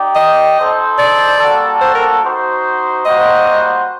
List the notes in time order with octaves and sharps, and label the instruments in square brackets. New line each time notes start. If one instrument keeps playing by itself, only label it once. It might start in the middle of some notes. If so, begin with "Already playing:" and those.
Already playing: [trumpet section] D#4 G4 D5 G5
[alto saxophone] D#5
[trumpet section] D#4 A4 C5
[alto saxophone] D5
[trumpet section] G3 A#3 F#4 A4
[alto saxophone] C5
A#4
[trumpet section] D#4 F#4 C5
[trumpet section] G3 A#3 F#4 C5 F#5 [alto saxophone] D#5